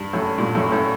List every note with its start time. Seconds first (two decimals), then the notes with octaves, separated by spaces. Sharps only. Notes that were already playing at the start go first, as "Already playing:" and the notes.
Already playing: G2
0.13 F#2 A2
0.38 G2 A#2
0.55 F#2 A2
0.72 A2